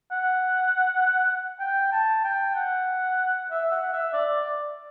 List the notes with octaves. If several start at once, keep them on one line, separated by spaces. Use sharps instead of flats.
F#5
G5
A5
G5
F#5
E5
F#5
E5
D5